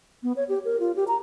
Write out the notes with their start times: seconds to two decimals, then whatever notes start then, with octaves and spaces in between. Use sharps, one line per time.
0.23 B3
0.36 C#5
0.49 G4
0.65 A#4
0.80 F4
0.96 G4
1.08 A#5